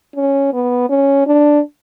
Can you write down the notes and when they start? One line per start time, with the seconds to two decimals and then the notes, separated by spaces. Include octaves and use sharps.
0.16 C#4
0.53 B3
0.89 C#4
1.27 D4